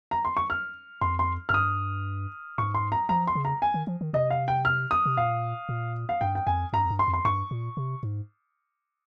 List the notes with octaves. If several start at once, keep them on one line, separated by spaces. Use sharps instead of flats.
A#5
C6
C#6
F6
F2 C6
C6
F2 F6
G2 D#6
G#2 C#6
C6
A#5
F3 A#5
C6
C#3
A#5
G#5
D#3
F3
D#3
C3 D#5
F5
G5
F6
D#6
C3
A#2 F5
A#2
F5
G2 G5
G5
F2 G#5
G2 A#5
F2
G2
C6
F2
C6
G2 C#6
A#2
C3
G#2